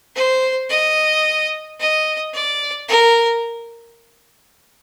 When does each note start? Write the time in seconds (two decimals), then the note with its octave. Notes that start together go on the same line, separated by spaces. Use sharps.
0.15 C5
0.70 D#5
1.80 D#5
2.33 D5
2.88 A#4